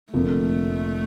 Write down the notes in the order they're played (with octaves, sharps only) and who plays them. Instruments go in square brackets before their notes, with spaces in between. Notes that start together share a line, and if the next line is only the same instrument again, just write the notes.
[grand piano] F1 F2 D3 F3 A#3 [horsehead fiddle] A3